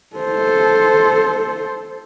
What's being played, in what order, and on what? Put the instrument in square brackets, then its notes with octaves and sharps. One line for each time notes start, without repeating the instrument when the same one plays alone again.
[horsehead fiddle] A4 C5